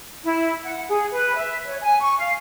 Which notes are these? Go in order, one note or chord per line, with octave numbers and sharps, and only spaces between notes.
E4
F#5
G#4
B4
E5
C#5
G#5
C#6
F5